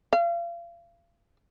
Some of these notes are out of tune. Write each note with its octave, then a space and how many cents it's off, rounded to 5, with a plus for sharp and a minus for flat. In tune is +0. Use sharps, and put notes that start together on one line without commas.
F5 -35